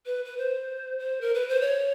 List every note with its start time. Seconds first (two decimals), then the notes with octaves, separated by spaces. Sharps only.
0.06 B4
0.25 B4
0.38 C5
0.99 C5
1.21 A#4
1.34 B4
1.49 C5
1.61 C#5